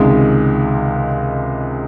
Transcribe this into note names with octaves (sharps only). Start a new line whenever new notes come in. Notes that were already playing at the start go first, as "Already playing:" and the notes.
Already playing: C#2 C3 D#3 G#3